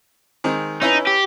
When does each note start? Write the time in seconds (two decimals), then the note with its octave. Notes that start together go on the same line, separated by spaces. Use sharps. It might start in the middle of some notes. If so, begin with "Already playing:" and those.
0.44 D#3 G#3 C4
0.82 C#4 D#4 E4 B4
1.07 G4